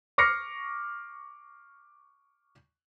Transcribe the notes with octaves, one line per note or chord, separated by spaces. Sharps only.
C#6 D6 F6 A#6 C7 C#7